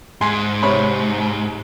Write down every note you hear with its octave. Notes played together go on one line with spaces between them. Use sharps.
G#2 G#5 C6
C3 C#5 B5